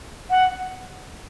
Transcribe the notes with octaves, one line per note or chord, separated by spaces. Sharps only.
F#5